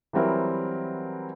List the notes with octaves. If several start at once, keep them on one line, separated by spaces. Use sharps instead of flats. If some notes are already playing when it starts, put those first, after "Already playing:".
E3 F#3 G3 C4 E4 A#4